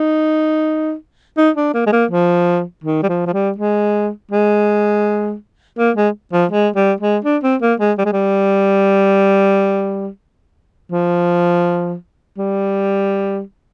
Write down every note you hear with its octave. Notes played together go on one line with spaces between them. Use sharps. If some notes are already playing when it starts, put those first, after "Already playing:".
Already playing: D#4
D#4
D4
A#3
G#3
A#3
F3
D#3
G3
F3
F3
G3
G#3
G#3
A#3
G#3
F3
G#3
G3
G#3
D4
C4
A#3
G#3
G3
G#3
G3
F3
G3